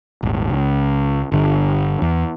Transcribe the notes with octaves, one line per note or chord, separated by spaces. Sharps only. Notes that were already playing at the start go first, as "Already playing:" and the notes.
D#1 G#1
C#2
G1 D3
E2